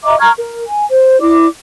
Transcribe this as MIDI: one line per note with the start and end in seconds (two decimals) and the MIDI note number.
0.04 0.18 75
0.04 0.18 76
0.04 0.18 82
0.04 0.18 86
0.19 0.30 82
0.19 0.30 85
0.19 0.30 89
0.19 0.30 92
0.38 0.63 70
0.66 0.85 80
0.90 1.19 72
1.20 1.47 64
1.20 1.47 74
1.20 1.47 86